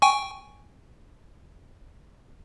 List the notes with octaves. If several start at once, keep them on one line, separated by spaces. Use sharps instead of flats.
G5 G#5 C#6